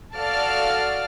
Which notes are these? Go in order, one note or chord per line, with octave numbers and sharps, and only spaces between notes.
F#4 A4 D5 F5 A5 F6